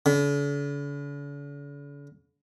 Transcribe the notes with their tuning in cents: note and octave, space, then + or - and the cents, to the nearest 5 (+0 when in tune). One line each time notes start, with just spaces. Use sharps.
D3 -45